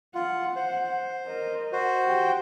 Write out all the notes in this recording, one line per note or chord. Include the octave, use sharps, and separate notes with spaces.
F4 F#5
C5
A#4 D#5
F#4 C5
G4 G5